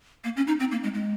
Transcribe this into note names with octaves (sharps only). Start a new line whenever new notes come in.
A#3
C#4
D#4
C4
A#3
G#3
G#3